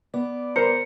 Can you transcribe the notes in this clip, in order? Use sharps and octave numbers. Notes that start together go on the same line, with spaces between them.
B3 D5
A#4 C5 A#5 C#7